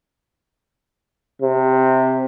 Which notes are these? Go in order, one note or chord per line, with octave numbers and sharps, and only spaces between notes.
C3